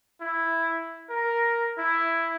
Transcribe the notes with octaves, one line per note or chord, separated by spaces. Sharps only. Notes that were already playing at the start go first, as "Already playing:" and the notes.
E4
A#4
E4